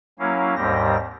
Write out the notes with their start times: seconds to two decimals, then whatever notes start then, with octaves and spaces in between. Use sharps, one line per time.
0.19 F#3 A#3 C#4 E4 F5
0.56 D#2 G#2 G3 C4 G4 A#6